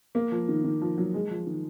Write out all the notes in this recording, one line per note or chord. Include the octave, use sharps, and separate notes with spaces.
A#3
F3
D#3
D#3
F3
F#3
G#3
F3
D#3